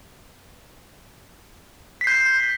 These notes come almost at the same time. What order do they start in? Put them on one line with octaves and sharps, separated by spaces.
B6 C7 G6